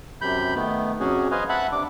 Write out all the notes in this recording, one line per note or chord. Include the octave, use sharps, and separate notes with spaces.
F#2 C3 B5 G6
D#3 A3 B3
F2 C3 C#4 F#4 G#4
B4 C5 D#5 F5 G#5
E5 F#5 A5 B5 F#6
C3 D4 D6